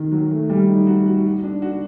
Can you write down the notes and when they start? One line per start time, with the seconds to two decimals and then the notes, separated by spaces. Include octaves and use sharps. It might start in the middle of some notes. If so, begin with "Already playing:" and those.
Already playing: D#3
0.12 F#3
0.31 A3
0.50 G3
0.69 D#4
0.87 F#4
1.06 F#4
1.24 F#4
1.44 D4
1.62 F#4